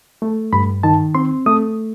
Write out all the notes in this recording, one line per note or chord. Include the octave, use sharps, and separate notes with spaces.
A3
G2 B5
D#3 A5
C4 C6
A3 D#6